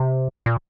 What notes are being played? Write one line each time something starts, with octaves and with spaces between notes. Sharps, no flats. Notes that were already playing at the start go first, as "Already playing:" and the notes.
Already playing: C3
A#2